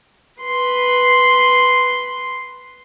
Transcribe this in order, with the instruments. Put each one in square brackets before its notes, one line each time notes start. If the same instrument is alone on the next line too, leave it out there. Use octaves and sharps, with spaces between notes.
[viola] B4 C6